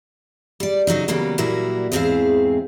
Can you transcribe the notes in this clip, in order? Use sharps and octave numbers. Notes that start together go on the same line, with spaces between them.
G3 D5
C#3 F#3 C#4 D#4
C#3 E3 F#3 G3 A#3 B3
A#2 F#3 G3 A#3 E4 F#4
E2 G#2 C4 E4 G#4 F5